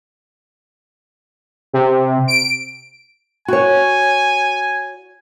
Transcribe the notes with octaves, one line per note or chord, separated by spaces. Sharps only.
C3
D7
F#4 C#5 G#5